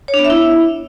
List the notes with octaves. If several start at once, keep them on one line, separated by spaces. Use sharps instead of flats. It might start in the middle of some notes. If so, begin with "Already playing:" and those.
C#5
D4
B3
E5
E4